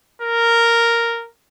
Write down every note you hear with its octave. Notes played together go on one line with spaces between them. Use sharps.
A#4